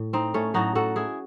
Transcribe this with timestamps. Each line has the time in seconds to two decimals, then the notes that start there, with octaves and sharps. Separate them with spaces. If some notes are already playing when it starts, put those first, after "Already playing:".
Already playing: A2
0.13 C4 D#4
0.34 A3 C#4
0.54 A2 F#3 D#4 F#4
0.75 F#4 A4
0.96 E4 G#4